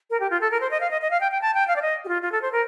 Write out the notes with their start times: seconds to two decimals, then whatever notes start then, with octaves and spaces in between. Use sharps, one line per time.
0.10 A#4
0.20 G4
0.31 F4
0.41 A4
0.51 A#4
0.61 C5
0.71 D#5
0.81 F5
0.91 D#5
1.01 D#5
1.11 F5
1.21 G5
1.31 G5
1.42 A5
1.54 G5
1.68 F5
1.76 D5
1.82 D#5
2.05 G4
2.08 F4
2.22 F4
2.32 A4
2.42 C5
2.52 A#4